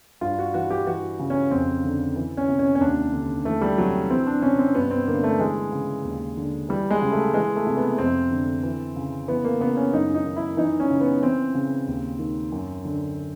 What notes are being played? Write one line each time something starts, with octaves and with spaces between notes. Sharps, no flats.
G2 F4
F#4
E3 F#4
G4
E3 F#4
C#3
C#4
F2 C4
D3
E3
C#4
C3
C#4
C#4
D#2 D4
D3
E3 A3
G3
C3 F#3
E3 C4
D4
C3 C#4
C4
G2 B3
C4
D3 A#3
A3
E3 G#3
C#3
D#2
D3
E3 G3
G#3
C#3
A3
E3 G#3
A3
C3
B3
F2 C4
D3
E3
C#3
E3 B3
A#3
C#3 B3
C#4
F#2 D#4
D#4
D#3
E4
E3 D#4
C#4
C#3
B3
E3 C4
C#3
D#2
D#3
F#2
D3